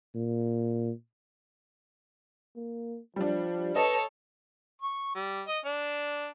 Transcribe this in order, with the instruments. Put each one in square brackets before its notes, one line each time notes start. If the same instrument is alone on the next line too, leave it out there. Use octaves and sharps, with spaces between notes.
[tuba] A#2
[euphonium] A#3
[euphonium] F3 [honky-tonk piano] G3 D4
[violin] A4 C#5 [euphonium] B4 [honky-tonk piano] D#5 A5
[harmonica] C#6
G3
D#5
D4